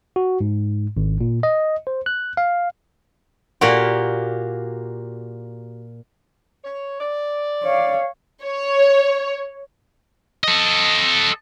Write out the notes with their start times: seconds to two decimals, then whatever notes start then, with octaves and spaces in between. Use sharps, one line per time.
0.16 F#4
0.41 G#2
0.97 G#1
1.21 A#2
1.43 D#5
1.87 C5
2.06 F#6
2.37 F5
3.61 A#2 A#3 F#4 G4
6.64 C#5
7.00 D5
7.64 C#5 F5
8.44 C#5
10.43 A4 D#5